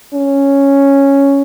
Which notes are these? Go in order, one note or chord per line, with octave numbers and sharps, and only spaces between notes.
C#4